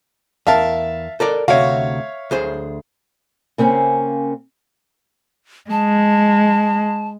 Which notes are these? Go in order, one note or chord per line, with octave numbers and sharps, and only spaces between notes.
E2 A#4 E5 F5 A5
A4 A#4 D5
D2 C3 F#4 C#5 E5 F5
D2 G#4 C5
C#3 A#3 C4 C#4
G#3 A5